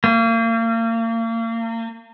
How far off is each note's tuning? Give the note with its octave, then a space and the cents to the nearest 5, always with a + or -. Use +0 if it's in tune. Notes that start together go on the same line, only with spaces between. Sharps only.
A#3 -35